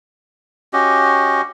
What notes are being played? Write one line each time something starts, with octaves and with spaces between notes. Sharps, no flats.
C#4 F#4 G4 D#5